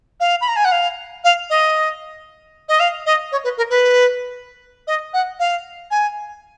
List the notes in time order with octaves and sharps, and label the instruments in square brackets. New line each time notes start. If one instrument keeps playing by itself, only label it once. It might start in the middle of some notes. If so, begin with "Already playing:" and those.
[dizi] F5
B5
A#5
G#5
F#5
F5
F5
D#5
D#5
F5
D#5
C#5
B4
A#4
B4
D#5
F#5
F5
G#5